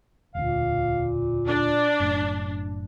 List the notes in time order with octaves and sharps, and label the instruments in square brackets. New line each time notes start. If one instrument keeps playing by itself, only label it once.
[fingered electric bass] E1 D2 [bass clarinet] A#2 [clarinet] F5
[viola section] D4 [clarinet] D5
[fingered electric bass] F#1 F#2 A2